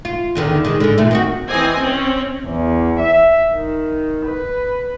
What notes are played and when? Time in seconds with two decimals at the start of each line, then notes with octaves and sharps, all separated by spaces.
0.05 F4
0.35 E2 D3 D#3
0.65 D#3 G#3
0.80 G#2 D3
0.98 A#2 A3
1.11 D#3 C4 F#4
1.49 E3 C4 D#5 G#5
1.79 C4 C#4
2.45 E2
2.99 E5
3.52 D#3
4.25 B4